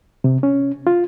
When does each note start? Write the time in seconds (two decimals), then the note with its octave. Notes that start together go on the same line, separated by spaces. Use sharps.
0.24 C3
0.43 C#4
0.87 F4